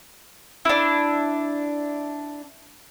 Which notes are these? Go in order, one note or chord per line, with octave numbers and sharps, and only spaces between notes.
D4 E4